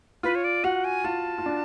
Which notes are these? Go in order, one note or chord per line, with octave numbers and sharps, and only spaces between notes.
F4 B4
C#5
D5
F#4 F#5
G#5
F4 A5
F4
D4